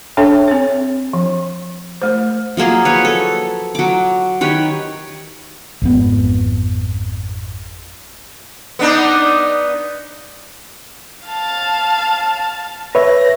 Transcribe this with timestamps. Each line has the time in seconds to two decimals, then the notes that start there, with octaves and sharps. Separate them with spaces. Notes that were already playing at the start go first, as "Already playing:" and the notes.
0.17 D4 A4 C#5 E5 G5 A5
0.48 C4 C#5
1.13 F3
2.02 A3 C5
2.57 F3 F#3 A#3 G#4
2.85 B4 C#5
3.05 A4
3.75 F#3 D6
4.41 D#3 G4 B4 C#5
5.82 G#1 F2 B3
8.79 B3 D4 D#4
11.26 F5 A5
12.95 B4 C#5 E5 A#6